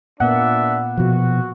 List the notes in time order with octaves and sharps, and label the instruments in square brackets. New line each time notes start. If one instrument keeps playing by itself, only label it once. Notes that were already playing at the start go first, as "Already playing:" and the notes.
[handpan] A#2 A#3 B3 [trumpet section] D4 D5 E5 [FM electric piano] F#5
[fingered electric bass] B2 F3 [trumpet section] F#4